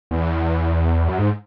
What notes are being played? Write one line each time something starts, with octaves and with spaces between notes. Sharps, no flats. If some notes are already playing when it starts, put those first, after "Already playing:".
E2
F#2
G#2